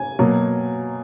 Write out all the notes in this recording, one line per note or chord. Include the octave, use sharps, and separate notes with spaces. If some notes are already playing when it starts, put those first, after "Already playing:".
Already playing: G#5
B2 F#3 A#3